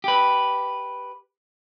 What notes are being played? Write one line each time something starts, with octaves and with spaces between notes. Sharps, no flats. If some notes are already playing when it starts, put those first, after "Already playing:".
G4 B4